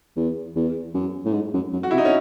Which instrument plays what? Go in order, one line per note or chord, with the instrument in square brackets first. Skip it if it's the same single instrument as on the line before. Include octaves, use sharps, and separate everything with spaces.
[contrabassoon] E2
E2
F#2
A2
G#2
F#2
F#2
[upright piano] F#4
[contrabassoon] C3 [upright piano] E4
[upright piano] D#4
C#4